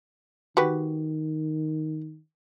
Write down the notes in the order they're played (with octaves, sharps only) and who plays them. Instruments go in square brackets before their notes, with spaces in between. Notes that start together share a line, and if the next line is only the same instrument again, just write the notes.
[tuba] D#3 [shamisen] F#4 G4 B4